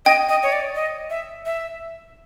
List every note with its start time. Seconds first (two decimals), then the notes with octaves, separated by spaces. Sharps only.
0.06 D#5 G5
0.29 D#5
0.43 C#5
0.52 D5
0.75 D#5
1.10 E5
1.46 E5